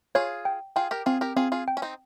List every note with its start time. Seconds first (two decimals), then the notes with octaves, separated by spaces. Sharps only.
0.15 F4 G#4 C#5
0.45 G5
0.76 F4 G#4 G5
0.91 G4 A#4
1.06 C4 F4 G#4
1.21 G4 A#4
1.36 C4 F4 G#4
1.52 F4 G#4
1.68 G5
1.77 C#4
1.82 C4 D#4